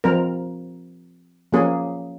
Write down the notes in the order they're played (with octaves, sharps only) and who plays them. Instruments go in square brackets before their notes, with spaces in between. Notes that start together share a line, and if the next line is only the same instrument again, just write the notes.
[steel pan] F3 C4 A#4
F3 A#3 C#4 G#4